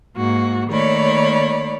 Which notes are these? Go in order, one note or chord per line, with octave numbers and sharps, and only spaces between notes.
G#2 A#3 F#4
D#3 A3 A#3 C#5 D5 B5